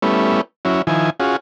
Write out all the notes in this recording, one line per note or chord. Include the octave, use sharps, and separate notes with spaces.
G3 A3 B3 C#4 E4
F#3 C#4 E4
D#3 F3 E4 G#5
C#4 F4 F#4 G#4